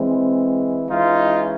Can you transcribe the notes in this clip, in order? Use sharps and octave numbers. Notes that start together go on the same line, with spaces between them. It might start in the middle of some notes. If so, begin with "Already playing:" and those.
Already playing: E3 G#3 C4
E3 G#3 C#4 D#4 F4